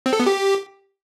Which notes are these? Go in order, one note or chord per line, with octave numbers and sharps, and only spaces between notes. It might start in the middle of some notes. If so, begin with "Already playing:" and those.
C4
A4
B3
G4